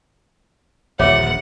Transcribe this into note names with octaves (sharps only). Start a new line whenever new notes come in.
D#1 A#1 D3 C#5 E5 F#5 D6